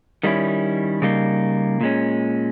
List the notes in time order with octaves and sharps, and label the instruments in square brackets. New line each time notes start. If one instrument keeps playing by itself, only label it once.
[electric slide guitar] D#3 G3 A#3 C#4 E4
C#3 G3 A#3 D#4
A#2 G#3 C#4